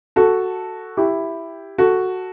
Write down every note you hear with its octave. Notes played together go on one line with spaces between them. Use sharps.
F#4 A4
E4 G4
F#4 A4